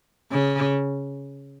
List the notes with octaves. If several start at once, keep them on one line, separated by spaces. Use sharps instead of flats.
C#3